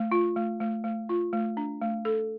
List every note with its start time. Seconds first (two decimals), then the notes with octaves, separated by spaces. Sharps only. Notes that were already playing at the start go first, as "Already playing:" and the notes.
Already playing: A3
0.12 F4
0.36 A3
0.61 A3
0.84 A3
1.09 F4
1.33 A3
1.57 D4
1.81 A3
2.05 A4